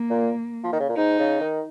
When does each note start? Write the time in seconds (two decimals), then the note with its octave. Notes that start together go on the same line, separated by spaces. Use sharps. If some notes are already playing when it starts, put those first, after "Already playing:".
Already playing: A#3
0.10 A#2
0.64 F3
0.72 D#3
0.80 C#3
0.89 A#2
0.97 G#2 D#4
1.19 C#3
1.41 D#3